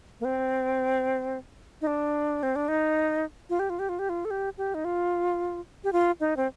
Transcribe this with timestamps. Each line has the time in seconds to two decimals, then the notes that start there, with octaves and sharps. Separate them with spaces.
0.20 A#3
0.25 C4
1.81 D#4
1.87 D4
2.43 C4
2.56 D4
2.68 D#4
3.50 F4
3.59 G4
3.70 F4
3.79 G4
3.89 F4
3.99 G4
4.09 F4
4.25 A4
4.31 G4
4.58 G4
4.74 D#4
4.85 F4
5.84 G4
5.93 F4
6.20 D#4
6.37 C4